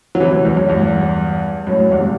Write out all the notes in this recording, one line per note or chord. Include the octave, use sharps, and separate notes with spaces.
F#3
C3 E3
F#2
E2
F#2
E2 G2
F#2 A2
F#2
E2 G2
C3